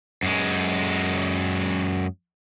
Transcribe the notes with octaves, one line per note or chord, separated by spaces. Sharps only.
F#2 G#3